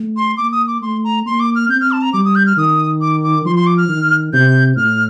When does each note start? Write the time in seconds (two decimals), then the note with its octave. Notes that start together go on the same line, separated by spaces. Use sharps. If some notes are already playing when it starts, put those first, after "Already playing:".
Already playing: A3
0.17 C6
0.37 A#3 D6
0.52 D#6
0.67 D6
0.81 A3 C6
1.04 A#5
1.25 A#3 C6
1.40 D6
1.56 F6
1.69 C4 G6
1.80 F6
1.92 A5
2.02 A#5
2.13 G3 D6
2.25 D#6
2.35 G6
2.46 F6
2.57 D#3 D#6
3.01 D6
3.23 D6
3.45 F3 C6
3.56 C6
3.67 D6
3.77 F6
3.89 D#3
4.33 C3 G6
4.76 A2 F6